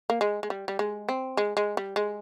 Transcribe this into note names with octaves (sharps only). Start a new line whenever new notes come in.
A#3
G#3
G#3
G3
G3
G#3
C4
G#3
G#3
G3
G#3